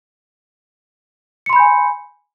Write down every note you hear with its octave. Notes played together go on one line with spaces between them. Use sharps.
G#5 B5 C6 G6 C#7